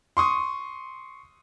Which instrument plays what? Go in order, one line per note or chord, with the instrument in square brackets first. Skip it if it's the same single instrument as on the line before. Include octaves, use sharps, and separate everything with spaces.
[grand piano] C6 C#6 D#6